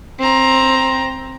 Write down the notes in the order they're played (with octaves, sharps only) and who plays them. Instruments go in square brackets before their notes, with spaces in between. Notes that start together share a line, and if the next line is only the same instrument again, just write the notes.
[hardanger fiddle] C4 A#5